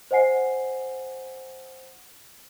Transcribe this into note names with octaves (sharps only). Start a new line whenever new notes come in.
C5 D#5 F#5 G#5 C7